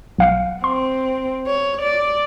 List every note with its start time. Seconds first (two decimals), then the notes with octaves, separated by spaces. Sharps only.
0.18 B1 F5 F#5
0.64 C4 C6
1.47 C#5
1.82 D5